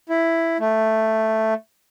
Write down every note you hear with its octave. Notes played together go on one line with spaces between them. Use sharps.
E4
A3